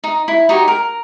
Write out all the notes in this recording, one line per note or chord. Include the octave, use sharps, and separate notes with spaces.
D#4
E4
D#4 F#4 G4 C#5
A#4